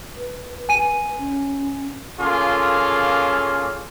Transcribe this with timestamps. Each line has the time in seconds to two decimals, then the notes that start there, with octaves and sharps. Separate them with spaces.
0.16 B4
0.69 G#5 D#7
1.18 C#4
2.20 A#3 C#4 F4 G#4 A4